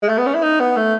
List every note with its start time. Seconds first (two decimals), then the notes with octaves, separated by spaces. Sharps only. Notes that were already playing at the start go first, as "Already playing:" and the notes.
0.03 G#3
0.09 A3
0.18 B3
0.26 C#4
0.35 E4
0.43 D#4
0.60 B3
0.77 A3